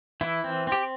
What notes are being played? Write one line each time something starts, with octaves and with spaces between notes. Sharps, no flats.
E3 E4
C4
C4 G4